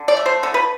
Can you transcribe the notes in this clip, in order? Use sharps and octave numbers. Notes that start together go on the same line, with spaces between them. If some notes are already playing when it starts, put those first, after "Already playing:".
Already playing: D3
D5
A3
C5
D3 A4
B4